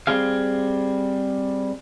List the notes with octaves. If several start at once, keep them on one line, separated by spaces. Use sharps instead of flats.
G3 C4 G#4 F5